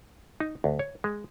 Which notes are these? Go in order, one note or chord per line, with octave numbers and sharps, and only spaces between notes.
D#4
D2
C#5
G#3